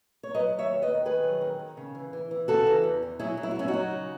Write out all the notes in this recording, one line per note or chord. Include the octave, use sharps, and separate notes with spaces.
C#5
F#3 B4 D#5
D#2
C#5 E5
D#2
B4 D#5
D#3
D#3 G#4 B4
F#3
D#3
D#3
C#3
E3
E3
E3
C#3 F#4 A4
E3
E2
E3
F#3 E4 G#4
F#3
E4
F#4
F#2 C#4 E4
D#4 F#4
F#3
C#3